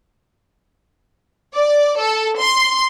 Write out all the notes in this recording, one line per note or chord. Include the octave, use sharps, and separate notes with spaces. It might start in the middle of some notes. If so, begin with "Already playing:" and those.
D5
A4
C6